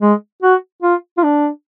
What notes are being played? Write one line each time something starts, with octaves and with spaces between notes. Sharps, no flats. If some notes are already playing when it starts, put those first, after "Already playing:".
G#3
F#4
F4
F4
D4